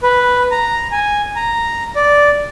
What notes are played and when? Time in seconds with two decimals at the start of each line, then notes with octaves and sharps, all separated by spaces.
0.03 B4
0.51 A#5
0.92 G#5
1.36 A#5
1.96 D5